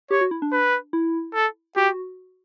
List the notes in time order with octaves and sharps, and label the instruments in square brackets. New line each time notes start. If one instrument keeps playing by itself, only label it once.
[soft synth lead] G4 [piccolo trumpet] C#5
[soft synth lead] F#4
E4
D4
[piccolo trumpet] B4
[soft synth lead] E4
[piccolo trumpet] A4
[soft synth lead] F#4 [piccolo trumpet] G4